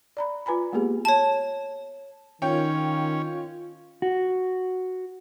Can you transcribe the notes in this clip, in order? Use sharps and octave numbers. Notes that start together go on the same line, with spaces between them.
D5 A#5 B5
F4 B4 G#5 A#5 B5
G#3 A#3 B3 G4 G#4
C#5 A5
D#3 C#4 F4 C#5 G5
F#4